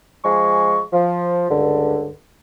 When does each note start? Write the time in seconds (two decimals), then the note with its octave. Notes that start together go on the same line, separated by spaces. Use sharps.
0.25 F3 G#3 G#5 C#6
0.93 F3
1.50 C#2 G2 D3